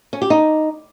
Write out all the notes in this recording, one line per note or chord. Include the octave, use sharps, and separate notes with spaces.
C#4
G4
D#4